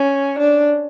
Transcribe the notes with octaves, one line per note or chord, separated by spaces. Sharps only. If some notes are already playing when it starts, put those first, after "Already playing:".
Already playing: C#4
D4